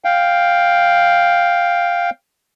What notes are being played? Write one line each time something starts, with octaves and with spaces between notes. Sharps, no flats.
F5 G5